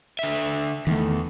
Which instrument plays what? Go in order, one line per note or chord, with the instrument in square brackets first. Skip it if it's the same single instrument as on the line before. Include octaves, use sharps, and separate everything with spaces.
[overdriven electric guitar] D3 E5
[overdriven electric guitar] E2 [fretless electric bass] D#3 A3